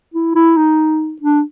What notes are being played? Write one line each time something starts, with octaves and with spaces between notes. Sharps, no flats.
E4
E4
D#4
D4